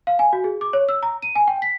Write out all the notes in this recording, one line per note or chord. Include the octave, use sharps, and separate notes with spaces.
F5
G#5
F#4
G#4
D6
C#5
E6
A#5
D#7
G#5
G5
B6